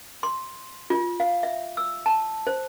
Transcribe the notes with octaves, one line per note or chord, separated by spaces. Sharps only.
C6
F4
F5
E5
E6
A5
C5